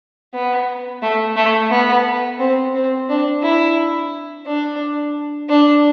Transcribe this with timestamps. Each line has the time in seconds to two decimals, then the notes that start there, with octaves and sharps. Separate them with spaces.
0.34 B3
1.02 A3
1.36 A3
1.71 B3
2.39 C4
2.75 C4
3.09 D4
3.43 E4
4.46 D4
5.49 D4